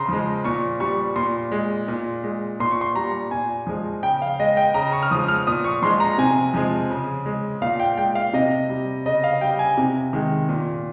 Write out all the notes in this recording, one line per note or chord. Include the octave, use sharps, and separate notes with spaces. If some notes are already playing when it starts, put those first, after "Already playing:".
Already playing: C#3 A#5 C6
F3 G#3
A#2 C#6
G3 C#6
A#2 C6
G#3
A#2
G#3
A#2 C6
C#6
C6
G3 A#5
A#2 G#5
F3 G#3
C#3 G5
F5
G#3 D#5
G5
C#3 A#5
C#6
F6
F3 G#3 D#6
F6
A#2 D#6
C#6
F3 G#3 C6
A#5
C3 G#5
F3 G#3
C#3
G#3
A#2 F5
G5
G#3 G5
F5
C3 D#5
G3
C#3 D#5
F5
G3 G5
G#5
C3
D#3 G#3
A#2